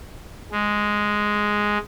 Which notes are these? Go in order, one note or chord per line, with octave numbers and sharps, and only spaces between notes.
G#3